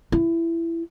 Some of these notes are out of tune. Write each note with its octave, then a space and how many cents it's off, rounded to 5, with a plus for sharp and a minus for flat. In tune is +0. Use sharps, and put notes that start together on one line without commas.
E4 +15